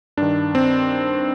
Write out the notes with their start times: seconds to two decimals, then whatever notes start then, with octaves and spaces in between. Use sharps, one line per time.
0.17 G2 D#3 D4
0.55 C4